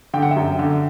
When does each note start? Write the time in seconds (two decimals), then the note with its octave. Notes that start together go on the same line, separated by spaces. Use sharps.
0.14 D3 G5
0.22 F#5
0.31 E5 G5
0.36 F#2
0.59 D3